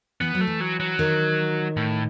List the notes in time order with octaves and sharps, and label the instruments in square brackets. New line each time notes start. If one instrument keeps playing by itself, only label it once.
[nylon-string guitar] E3 [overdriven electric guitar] B3
[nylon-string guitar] F#3
[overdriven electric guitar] A3
[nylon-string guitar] E3
[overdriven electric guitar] F#3
F#3
[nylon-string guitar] D#3
[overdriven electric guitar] A2